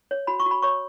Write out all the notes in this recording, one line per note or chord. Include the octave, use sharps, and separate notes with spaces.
C#5
F#4 B5
C#6
F#4
B5
C#5 C#6